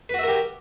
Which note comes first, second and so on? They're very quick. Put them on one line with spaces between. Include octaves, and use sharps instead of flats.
B4 F#4 E5 A#4 G4